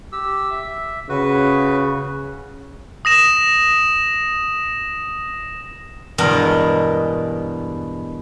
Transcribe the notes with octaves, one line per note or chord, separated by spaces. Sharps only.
G4 E6
E5
C#3 F#4 B4
D#6 A#6 E7
E2 G2 B2 G#3 A#4 D#5